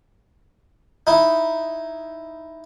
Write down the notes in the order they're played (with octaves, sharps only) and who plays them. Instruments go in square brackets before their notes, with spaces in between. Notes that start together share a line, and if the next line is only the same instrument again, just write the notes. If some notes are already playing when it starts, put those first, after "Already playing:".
[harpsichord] D#4 E4